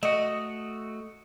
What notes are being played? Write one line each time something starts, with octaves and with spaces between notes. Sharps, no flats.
A3 F#4 D#5